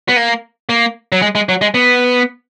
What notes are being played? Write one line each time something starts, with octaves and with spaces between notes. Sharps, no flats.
B3
A#3
A#3
F#3
G#3
G#3
F#3
G#3
B3